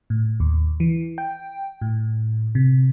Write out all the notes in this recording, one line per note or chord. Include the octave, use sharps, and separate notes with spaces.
A2
D#2
E3
G5
A2
C3